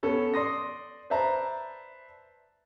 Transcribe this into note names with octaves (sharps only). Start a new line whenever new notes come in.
B3 C#4 A4
D5 C6 D#6 A#6
B4 C5 D5 E5 A5 A#5